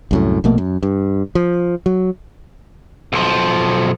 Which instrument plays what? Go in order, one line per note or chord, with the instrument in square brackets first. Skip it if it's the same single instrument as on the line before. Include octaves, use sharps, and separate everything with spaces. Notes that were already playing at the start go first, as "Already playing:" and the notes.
[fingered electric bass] C2 F#2 A2
A#1 B2 A3 A#3
F#2
G2
F3
F#3
[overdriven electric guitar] B1 F3